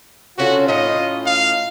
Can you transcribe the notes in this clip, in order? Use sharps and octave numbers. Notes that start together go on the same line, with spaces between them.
C#3 C#4 F4 F#4 A4
A2 C#4 D#4 D#5
F5